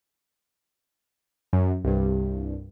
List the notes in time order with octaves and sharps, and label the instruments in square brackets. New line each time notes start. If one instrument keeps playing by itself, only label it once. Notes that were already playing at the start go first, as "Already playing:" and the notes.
[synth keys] F#2
C2 G2